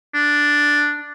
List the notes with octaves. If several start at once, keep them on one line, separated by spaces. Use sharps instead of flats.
D4